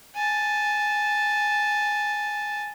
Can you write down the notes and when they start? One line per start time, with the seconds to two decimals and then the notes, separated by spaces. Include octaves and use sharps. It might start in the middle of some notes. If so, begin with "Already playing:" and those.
0.15 G#5 A5